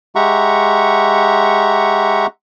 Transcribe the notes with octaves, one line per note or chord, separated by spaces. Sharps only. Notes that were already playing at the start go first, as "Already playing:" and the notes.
G#3 G4 E5 F#5 A#5 C#6